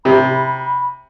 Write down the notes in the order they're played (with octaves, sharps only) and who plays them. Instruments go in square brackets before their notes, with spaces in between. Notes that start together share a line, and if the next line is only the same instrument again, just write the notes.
[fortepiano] C3 [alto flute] B5